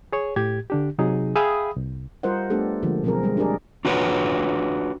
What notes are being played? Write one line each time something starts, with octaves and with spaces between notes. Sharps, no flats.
G#4 C#5
A2 G4 G#6
D3 D4 G4
C3 F#3 D#4 G#4
G#4 E5 F5 G5 B5 D#6
C2
G3 F4 A#4 C5 D#5 F#5
A3 B3 D4 G4 A4
D3 F3 G#3 A#3
B2 F3 F#3 C4 G#4 A#4
G3 G#3
D4 G4 G#4 A#4 D5
D4 F4 F#4 B4 C#5